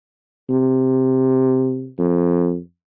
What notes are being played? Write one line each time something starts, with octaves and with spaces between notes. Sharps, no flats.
C3
F2